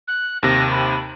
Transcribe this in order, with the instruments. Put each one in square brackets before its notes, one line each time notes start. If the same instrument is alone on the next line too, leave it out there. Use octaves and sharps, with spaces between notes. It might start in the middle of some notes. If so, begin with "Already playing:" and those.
[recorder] F#6
[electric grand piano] D#2 C3 [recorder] A#6
[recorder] B5